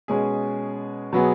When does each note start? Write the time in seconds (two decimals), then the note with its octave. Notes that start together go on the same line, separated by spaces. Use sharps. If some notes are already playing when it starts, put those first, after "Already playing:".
0.08 B2 G#3 C#4 G#4
1.13 B2 F#3 B3 G#4